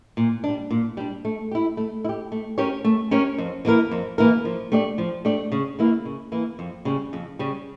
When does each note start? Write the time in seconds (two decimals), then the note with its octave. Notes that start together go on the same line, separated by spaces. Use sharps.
0.17 A#2
0.44 G3 D4
0.71 A#2
0.97 G3 D4
1.25 A3
1.51 E4 G4
1.77 A3
2.05 E4
2.09 G4
2.32 A3
2.58 C#4 G4 A#4 C#5
2.85 A3
3.11 C#4 G4 A#4 C#5
3.38 F2
3.65 E3 A#3 E4 A#4
3.91 F2
4.18 E3 A#3 E4 A#4
4.45 F3
4.72 A3 D4 G4 D5
4.98 F3
5.25 A3 D4 G4 D5
5.52 C#3
5.79 E3 A#3 E4
6.05 C#3
6.32 E3 A#3 E4
6.59 F2
6.85 C#3 G3
7.13 F2
7.39 C#3 G3